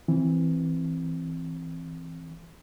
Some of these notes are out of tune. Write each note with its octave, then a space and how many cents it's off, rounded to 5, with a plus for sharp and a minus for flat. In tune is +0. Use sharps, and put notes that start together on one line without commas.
E3 +0 C4 +0